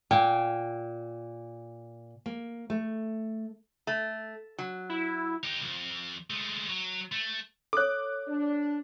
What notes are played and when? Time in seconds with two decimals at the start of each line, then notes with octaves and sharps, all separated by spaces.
0.11 A#2 G5
2.26 A#3
2.70 A3
3.87 A3
4.58 F#3
4.90 E4
5.43 D#4 G4
5.61 B1 F2
6.30 G#3 A3
6.69 F#3
7.12 A3
7.73 A4 C#5 D6 F#6
8.28 D4